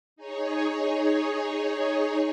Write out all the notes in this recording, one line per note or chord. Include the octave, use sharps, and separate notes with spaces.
D#4 G#4 C#5